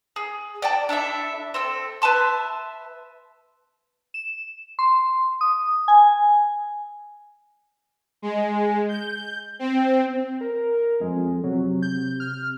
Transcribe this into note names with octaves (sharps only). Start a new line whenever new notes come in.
G#4
D5 G5 A5
D4 E4 A4 E5
C4 A4 E6
B4 E5 A5 C6
E7
C6
D#6
G#5
G#3
G6
C4
A#4
F2 G#3
C3 F#3
G6
F6